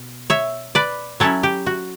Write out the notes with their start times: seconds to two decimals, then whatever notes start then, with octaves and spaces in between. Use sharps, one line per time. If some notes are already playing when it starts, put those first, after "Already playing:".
Already playing: B2
0.30 C#5 E5
0.75 B4 D5
1.20 F#3 C#4 E4 A4 C#5
1.43 G4
1.66 F#4